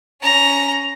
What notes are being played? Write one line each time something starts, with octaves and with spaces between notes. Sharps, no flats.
C#4 A#5